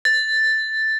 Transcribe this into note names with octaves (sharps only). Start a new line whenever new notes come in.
A6